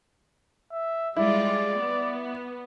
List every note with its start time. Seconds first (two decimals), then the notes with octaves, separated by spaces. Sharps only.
0.72 E5
1.17 G3 G#3 E4 F4 D5
1.78 B3